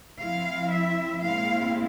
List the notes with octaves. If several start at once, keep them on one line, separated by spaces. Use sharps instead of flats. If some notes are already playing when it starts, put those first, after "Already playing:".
F3 C4 E4 F5
E5
A#2 G#3 C4 E4 F5